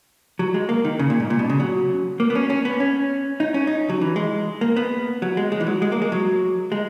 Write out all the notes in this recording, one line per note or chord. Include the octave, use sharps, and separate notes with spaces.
F#3
G#3
A#3
D#3
C#3
A#2
G#2
A#2
B2
C#3
F#3
A#3
B3
C#4
C#4
B3
C#4
D#4
C#4
D#4
F#3
E3
G#3
A#3
B3
F#3
G#3
G#3
E3
F#3
G#3
A#3
G#3
F#3
G#3